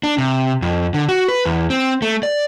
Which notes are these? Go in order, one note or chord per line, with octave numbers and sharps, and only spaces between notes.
D4
C3
F2
D3
F#4
B4
E2
C4
A3
D5